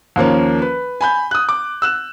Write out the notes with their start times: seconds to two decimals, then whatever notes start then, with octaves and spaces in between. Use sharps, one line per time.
0.16 D#2 F3 A#3 C#4
0.62 B4
1.01 G#5 B5 G6
1.31 D#6 F#6
1.49 D6
1.82 E6 F#6 E7